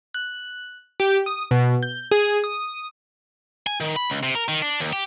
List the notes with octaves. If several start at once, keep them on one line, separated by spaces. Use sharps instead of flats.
F#6
G4
D#6
B2
G6
G#4
D#6
G#5
D#3
B5
C#2
C3
A#4
D#3
D4
D#2
G4